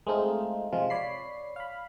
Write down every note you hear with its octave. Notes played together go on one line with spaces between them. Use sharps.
G#3 A3 C4 D#4 F4
C3 F3 G#3 F4
C#5 D5 B5 C7
F5 B5